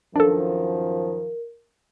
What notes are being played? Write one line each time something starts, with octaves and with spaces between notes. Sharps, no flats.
F#2 D#3 F3 D4 A4 A#4